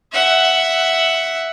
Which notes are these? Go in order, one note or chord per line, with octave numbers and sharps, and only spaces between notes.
E5 F#5